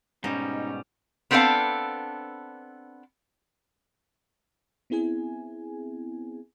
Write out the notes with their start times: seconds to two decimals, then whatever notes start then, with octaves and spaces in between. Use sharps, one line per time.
0.24 G#2 B2 G3 C#4 D#4
1.31 B3 C4 D4 A4 D5 F5
4.90 B3 C4 E4 G#4 G#5